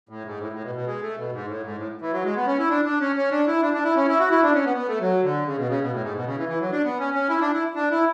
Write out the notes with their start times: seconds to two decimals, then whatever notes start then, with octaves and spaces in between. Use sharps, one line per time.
0.09 A2
0.25 G#2
0.40 A2
0.52 A2
0.64 B2
0.75 B2
0.86 G#3
1.02 A3
1.17 B2
1.32 G#2
1.48 A2
1.63 G#2
1.77 A2
2.01 E3
2.13 F#3
2.24 G#3
2.36 B3
2.47 C#4
2.59 E4
2.70 D4
2.85 D4
3.01 C#4
3.16 C#4
3.31 D4
3.47 E4
3.62 D4
3.74 D4
3.84 E4
3.96 C#4
4.08 E4
4.19 F#4
4.31 E4
4.43 D4
4.54 C#4
4.66 B3
4.77 B3
4.88 A3
5.00 F#3
5.23 D3
5.46 C#3
5.57 B2
5.69 C#3
5.81 B2
5.92 A2
6.03 G#2
6.15 B2
6.26 C#3
6.38 E3
6.49 E3
6.60 F#3
6.72 D4
6.84 B3
6.99 C#4
7.14 C#4
7.29 E4
7.41 D4
7.53 E4
7.75 D4
7.91 E4